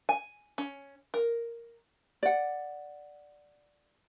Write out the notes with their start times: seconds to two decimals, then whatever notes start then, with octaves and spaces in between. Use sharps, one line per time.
0.09 G#5
0.58 C#4
1.14 A#4
2.23 D5 F#5